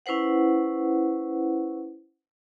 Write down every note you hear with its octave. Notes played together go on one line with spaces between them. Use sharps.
C#4 E4 B4 C5 F#5